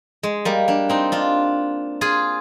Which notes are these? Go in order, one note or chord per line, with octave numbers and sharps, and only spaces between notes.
G#3
G3 A#3
A#3 D4
C4 D#4
D4 F4
F4 G#4